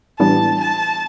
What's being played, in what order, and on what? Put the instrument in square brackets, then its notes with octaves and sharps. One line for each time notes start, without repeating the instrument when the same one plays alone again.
[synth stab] A2 E3 G3 B3 D4 [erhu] A5
[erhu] A5